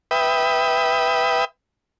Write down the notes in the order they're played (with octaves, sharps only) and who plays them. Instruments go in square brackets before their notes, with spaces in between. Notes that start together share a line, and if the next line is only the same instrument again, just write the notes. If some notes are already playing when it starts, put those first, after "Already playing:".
[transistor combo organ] B4 E5 G5 D#6